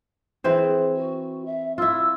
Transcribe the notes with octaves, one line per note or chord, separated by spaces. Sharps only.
E3 C4 G#4 C5
F#4
E5
E4 F4 E6